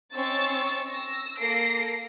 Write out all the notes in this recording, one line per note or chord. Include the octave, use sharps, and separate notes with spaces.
C4 C#4 D#4 C#6 E6 A6
E6 A#6
A#3 A4 A#6 C7 D7